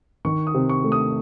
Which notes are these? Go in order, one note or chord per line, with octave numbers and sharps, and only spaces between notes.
D#3 C#6
D#6
C3
C#6
A3
D#6